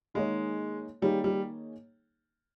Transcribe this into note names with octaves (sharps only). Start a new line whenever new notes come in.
D#3 G#3 A#3 D#4 G#4 C#5
D#3 G3 A#3 D#4 G#4 C#5
G3